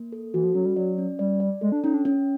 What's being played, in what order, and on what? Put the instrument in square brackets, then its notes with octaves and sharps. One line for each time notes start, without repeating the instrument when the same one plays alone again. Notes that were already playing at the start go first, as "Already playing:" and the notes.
Already playing: [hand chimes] A#3
A4
[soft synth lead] E3 [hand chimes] F#4
[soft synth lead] F3
[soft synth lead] F#3 [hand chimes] C#4
[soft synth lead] G3
[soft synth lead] F#3 [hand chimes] D5
[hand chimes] C#4
[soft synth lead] G3 [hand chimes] D5
[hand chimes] D5
[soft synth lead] G#3 [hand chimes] A4
[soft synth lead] D4
[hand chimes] C#4 [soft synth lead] D#4
[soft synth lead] D4
[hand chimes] C#4